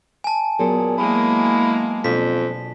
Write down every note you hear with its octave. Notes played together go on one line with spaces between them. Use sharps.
G#5 A5
A#2 F#3 B3 G#4
G#3 A#3 E4
F2 B2 D4 B6